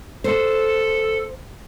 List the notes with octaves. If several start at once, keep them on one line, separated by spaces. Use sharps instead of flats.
A4 C5